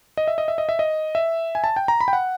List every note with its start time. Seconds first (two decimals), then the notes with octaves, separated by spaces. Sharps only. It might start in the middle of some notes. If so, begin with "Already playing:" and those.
0.17 D#5
0.28 E5
0.38 D#5
0.48 E5
0.58 D#5
0.69 E5
0.79 D#5
1.15 E5
1.55 G#5
1.64 A5
1.76 G5
1.88 A#5
2.00 B5
2.08 G5
2.13 F#5